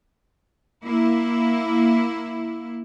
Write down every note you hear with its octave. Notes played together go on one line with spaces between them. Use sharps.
A#3 E4